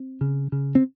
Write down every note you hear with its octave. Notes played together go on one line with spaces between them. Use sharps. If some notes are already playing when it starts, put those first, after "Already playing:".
Already playing: C4
C#3
C#3
C4